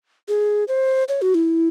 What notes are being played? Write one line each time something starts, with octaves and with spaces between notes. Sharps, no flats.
G#4
C5
C#5
F#4
E4